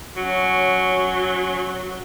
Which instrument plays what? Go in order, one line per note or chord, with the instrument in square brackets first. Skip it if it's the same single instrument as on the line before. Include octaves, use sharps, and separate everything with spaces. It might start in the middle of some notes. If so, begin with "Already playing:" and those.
[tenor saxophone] F#3 [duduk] C#4